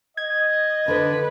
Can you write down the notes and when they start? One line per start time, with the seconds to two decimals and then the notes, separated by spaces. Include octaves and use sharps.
0.17 D#5 G#6
0.88 D3 B4